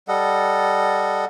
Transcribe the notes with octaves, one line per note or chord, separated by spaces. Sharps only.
G3 A4 D#5 F#5